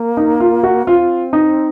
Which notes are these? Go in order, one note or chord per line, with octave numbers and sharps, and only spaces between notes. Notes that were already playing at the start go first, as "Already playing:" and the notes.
Already playing: A#3
D#4
F4
F#4
C4 F4
D#4